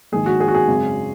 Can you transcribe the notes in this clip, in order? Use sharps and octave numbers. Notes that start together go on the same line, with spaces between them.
A#1 G#2 D#3 G#4
F#4
G#4
F#4
G#4
G#1 F#2 C#3